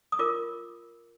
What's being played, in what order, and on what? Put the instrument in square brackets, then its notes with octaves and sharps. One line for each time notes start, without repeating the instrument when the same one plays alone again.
[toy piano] D#6
F4 A#4 D6